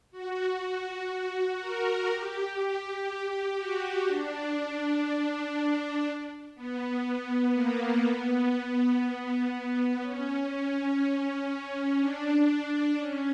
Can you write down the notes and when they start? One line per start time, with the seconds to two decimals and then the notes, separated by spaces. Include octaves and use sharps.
0.12 F#4
1.60 A#4
2.09 G4
3.58 F#4
4.07 D4
6.55 B3
7.04 B3
7.54 A#3
8.04 B3
8.53 B3
9.02 B3
9.52 B3
10.02 C#4
10.51 C#4
12.00 D4
12.99 C#4